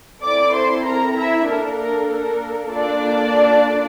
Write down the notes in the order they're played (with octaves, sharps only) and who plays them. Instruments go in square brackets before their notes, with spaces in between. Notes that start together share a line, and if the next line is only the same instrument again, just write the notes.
[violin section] C4 E4 A4 D5 D6
C5 C6
A#4 A#5
E4 E5
A#3 D4 A4 A#4
A#4
A#4
A#3 D4 F4 A4 D5